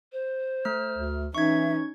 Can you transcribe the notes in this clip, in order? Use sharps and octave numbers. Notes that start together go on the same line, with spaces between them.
C5
A3 F6
D2
E3 C#4 D#4 E5 C#6 G#6